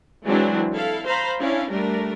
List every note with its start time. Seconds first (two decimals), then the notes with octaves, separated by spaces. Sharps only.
0.24 E3 F#3 G#3 C4 D4 E4
0.74 E4 A4 F5
1.06 C5 F5 A#5 B5
1.38 C#4 D4 E4 F5
1.71 G3 A3 D4 A#4